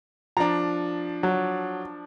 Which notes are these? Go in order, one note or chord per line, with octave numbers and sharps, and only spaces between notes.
F3 D4 A#5
F#3